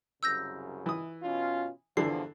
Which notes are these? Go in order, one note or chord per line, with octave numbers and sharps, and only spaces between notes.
C2 F#2 C#3 E6 G6 A#6
E3 D#6
B2 C#4 F4
E2 G2 D3 E3 F3 C7